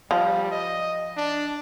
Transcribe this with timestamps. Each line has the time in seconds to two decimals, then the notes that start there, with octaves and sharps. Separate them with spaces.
0.11 F3 G3
0.51 D#5
1.17 D4